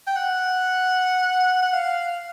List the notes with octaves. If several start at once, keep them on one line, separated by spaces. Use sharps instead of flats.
G5
F#5
F#5
F5